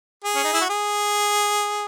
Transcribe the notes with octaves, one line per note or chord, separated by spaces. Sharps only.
G#4
C#4
D#4
E4
F#4
G#4